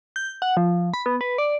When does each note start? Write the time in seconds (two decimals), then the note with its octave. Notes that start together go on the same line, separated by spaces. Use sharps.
0.16 G6
0.42 F#5
0.57 F3
0.94 B5
1.06 B3
1.21 B4
1.38 D5